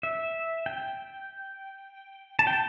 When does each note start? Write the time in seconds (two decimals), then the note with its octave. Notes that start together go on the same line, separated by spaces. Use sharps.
0.03 E5
0.66 G5
2.39 A5
2.47 G5